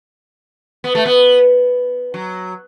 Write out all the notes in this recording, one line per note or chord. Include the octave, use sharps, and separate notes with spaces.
B3
A3
B3
F#3